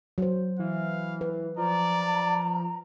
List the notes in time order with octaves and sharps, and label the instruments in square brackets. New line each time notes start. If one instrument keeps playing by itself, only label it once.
[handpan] F#3 C5
[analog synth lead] E3 [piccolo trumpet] F5
[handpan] B4
[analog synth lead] F3 [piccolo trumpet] D5 [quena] A#5